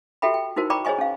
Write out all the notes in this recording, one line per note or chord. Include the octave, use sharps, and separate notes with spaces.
F#4 G4 A4 E5 G5 B5
G5
D#4 E4 F#4 A#4 C5
D5 G5 A#5 B5 C#6 D6
G#4 C5 C#5 D#5 G#5 C#6
C#4 F5